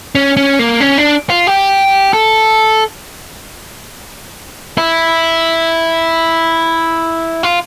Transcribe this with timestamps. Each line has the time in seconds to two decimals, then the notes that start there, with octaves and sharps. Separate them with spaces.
0.15 C#4
0.37 C#4
0.59 A#3
0.80 C#4
0.98 D4
1.30 F4
1.47 G4
2.13 A4
4.78 E4
7.43 F4